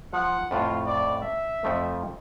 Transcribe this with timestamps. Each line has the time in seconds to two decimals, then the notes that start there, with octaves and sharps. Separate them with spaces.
0.13 F3 F#5
0.51 F2 A2 F4
0.86 D5
1.22 E5
1.63 F2 F3 A3